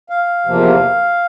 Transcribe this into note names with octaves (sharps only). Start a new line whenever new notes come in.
F5
E2 C3 F3 A#3